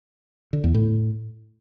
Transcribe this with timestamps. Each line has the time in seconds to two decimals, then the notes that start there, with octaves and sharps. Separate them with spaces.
0.53 D3
0.64 E2
0.74 A2